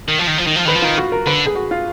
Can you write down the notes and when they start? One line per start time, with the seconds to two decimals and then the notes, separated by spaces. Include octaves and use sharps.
0.08 D#3
0.19 F3
0.27 D#3
0.38 F3
0.46 D#3
0.56 F3
0.65 D#3 B4
0.75 F3
0.82 D#3 F4
0.98 F#4
1.12 A#4
1.27 D3 B4
1.46 G#4
1.55 F#4
1.71 F4